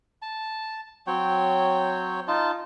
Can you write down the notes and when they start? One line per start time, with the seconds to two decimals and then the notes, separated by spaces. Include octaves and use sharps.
0.22 A5
1.07 F#3 C4 C#5 G5
2.28 D#4 F4 A5